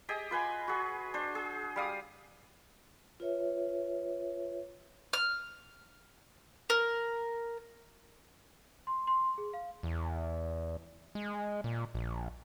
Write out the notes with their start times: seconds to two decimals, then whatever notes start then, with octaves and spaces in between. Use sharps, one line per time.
0.09 G4 G#4 D#5
0.31 F4 B4 G#5 C6
0.68 F#4 G#4
1.14 D4 C5
1.35 G#4
1.76 G3 F5 D#6
3.20 F4 B4 C#5 E5
5.13 F6
6.70 A#4
8.87 C6
9.07 C6
9.38 G#4
9.54 F5
9.83 E2
11.15 G#3
11.64 A#2
11.95 A#1